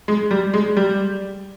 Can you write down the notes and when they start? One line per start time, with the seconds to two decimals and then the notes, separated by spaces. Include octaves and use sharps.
0.08 G#3
0.31 G3
0.54 G#3
0.77 G3